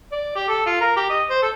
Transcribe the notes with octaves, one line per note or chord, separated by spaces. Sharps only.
D5
G4
A4
F4
A#4
G4
D#5
C5
A4